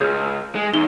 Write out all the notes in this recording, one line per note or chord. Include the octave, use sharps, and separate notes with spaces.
C#2 G#4 C#5 F6 G6
G#3
E2 D#4 F7 G7